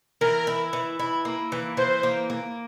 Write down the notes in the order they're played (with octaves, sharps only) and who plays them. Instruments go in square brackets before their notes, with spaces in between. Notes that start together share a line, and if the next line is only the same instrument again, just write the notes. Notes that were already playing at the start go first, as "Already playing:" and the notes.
[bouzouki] E3 [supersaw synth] A#4
[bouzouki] E4
E3
E4
A#3
E3
[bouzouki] E3 [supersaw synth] C5
[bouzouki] A#3
A#3